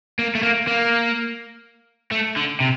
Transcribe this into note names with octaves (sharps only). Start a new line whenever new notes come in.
A#3
A3
A#3
A#3
A3
D3
C3